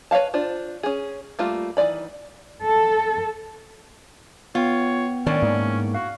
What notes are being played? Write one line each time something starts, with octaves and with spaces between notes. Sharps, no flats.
B4 C#5 E5 F5 A5
D4 F4 C5
C#4 G#4
G3 A3 A#3 F4
D#3 E3 C4 D5 B5
A4
B3 F4 C#5 G5
A2 D#3 C#4 D4 D5
G#2 A#3
F#4 F5